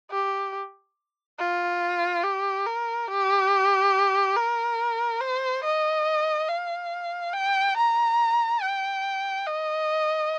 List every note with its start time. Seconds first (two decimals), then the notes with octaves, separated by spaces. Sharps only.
0.11 G4
1.39 F4
2.24 G4
2.66 A#4
3.08 G4
4.36 A#4
5.21 C5
5.64 D#5
6.49 F5
7.34 G5
7.77 A#5
8.62 G5
9.47 D#5